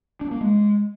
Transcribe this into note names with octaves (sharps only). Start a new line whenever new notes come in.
D4
A#3
G#3